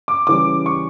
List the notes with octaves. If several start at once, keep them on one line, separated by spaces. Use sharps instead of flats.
D6
C#3 E3 G3 D6
C#6